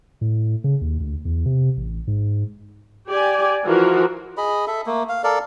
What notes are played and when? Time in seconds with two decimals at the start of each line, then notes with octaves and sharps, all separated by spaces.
0.21 A2
0.64 C#3
0.81 D#2
1.00 D2
1.25 E2
1.46 C3
1.77 A1
2.07 G#2
3.07 G4 D5 G#5
3.65 E3 F3 F4 F#4 A#4
4.37 G#4 D#5 B5
4.67 A4 E5
4.86 A3 A#3
5.09 F5
5.24 A4 A#4 D5 F5